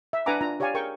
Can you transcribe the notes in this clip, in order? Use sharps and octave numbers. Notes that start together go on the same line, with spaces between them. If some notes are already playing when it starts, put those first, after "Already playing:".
E5
D4 B4 F#5 G#5 A#5 D6
D4 F4 A#5
G4 C#5 D5 F5 G#5
G#4 A#4 G5 C#6